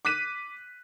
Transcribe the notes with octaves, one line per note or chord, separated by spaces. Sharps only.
D6 F#6 B6 D#7